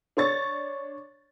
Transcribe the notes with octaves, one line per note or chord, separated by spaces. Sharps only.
D4 C#5 C#6 A6